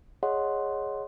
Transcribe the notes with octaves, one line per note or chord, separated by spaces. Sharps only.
G#4 C#5 D#5 F#5 C6